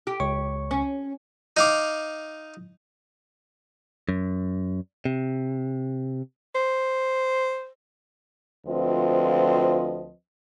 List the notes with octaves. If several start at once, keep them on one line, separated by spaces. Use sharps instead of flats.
G4
C#2 C#5 C#6
C#4
D#4 F5 D6
F#2
C3
C5
D2 F3 C4 F4 B4 D#5